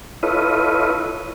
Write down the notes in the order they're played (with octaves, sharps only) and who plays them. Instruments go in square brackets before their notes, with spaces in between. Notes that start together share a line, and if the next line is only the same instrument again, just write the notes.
[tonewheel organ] E4 F4 A4 B4 C#5 D#5